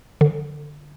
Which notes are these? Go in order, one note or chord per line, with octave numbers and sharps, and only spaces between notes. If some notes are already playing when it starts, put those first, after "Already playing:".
D3